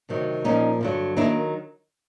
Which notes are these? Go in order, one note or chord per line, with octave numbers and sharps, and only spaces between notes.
D2 C3 D#3 F#3
A#2 F3 A#3 C#4 D#4
G2 D3 F#3
D#3 F#3 A#3 D4 E4